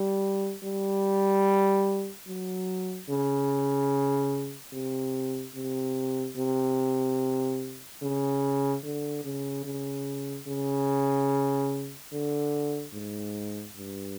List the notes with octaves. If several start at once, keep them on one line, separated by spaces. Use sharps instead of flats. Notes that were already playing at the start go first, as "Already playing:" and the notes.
Already playing: G3
G3
F#3
C#3
C3
C3
C3
C#3
D3
C#3
C#3
C#3
D3
G#2
G2